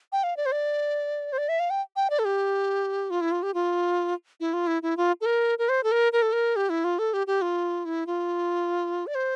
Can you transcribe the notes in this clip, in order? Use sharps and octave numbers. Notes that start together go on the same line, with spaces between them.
G5
F5
D5
C5
D5
C5
D5
E5
F5
G5
G5
D5
A4
G4
F4
E4
F4
G4
F4
E4
F4
E4
E4
F4
A4
A#4
A#4
C5
A4
A#4
A#4
A4
A#4
G4
E4
F4
A4
G4
G4
F4
E4
F4
D5
C5